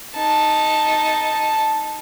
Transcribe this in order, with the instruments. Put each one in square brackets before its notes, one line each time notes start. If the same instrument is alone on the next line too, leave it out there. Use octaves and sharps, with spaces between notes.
[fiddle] D#4 A5